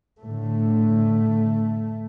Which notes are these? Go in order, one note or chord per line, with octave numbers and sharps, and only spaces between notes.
A2 D3 A3